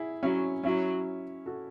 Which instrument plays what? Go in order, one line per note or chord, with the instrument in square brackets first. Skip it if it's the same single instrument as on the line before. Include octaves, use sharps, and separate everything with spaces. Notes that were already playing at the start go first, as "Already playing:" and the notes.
Already playing: [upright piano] E4 G#4
[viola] F#3 [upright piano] C#4 E4
[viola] F#3 [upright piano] C#4 E4
[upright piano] F#4 A4